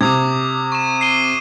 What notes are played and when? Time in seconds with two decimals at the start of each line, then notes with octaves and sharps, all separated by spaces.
0.01 C3 D6 D#6 G#6
0.72 C#6 E7
1.01 C7 D#7 G7